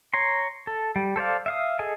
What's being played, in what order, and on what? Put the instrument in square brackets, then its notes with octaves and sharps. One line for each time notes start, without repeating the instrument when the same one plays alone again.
[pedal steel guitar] C#5 A#5 C6
A4
G3
A4 C5 D5 F5
E5 F5 D#6
G#4 A4 D#5 G#5